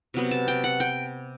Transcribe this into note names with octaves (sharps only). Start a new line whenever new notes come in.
C3 F#3 B3
A5
G5
F#5
G5